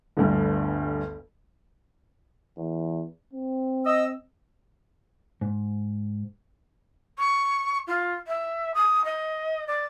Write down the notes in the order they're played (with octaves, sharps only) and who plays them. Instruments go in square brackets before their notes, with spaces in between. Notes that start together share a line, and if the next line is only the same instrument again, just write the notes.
[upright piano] G1 D2 G2
[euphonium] E2
C4
[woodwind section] D#5 E6
[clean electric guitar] G#2
[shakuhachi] C#6
F4
E5
D#6
D#5
D5